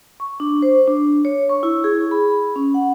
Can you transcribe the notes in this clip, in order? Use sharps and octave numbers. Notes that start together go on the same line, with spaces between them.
C#6
D4
C5
D4
C#5
C#6
E4
G#4
B5
C#4
F#5